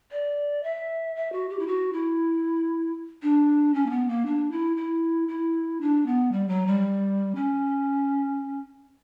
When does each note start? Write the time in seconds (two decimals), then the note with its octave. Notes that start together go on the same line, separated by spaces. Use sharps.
0.11 D5
0.63 E5
1.16 E5
1.32 F#4
1.49 G4
1.59 E4
1.67 F#4
1.93 E4
3.22 D4
3.74 C#4
3.86 A#3
3.90 B3
4.08 A#3
4.26 D4
4.51 E4
4.77 E4
5.28 E4
5.81 D4
6.06 B3
6.32 G3
6.48 F#3
6.67 G3
7.35 C#4